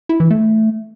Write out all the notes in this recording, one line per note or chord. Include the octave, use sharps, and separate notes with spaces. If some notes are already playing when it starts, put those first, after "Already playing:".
E4
E3
A3